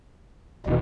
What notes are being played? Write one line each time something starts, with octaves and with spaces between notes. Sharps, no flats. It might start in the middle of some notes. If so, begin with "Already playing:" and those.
D#1 B2 D#3 E3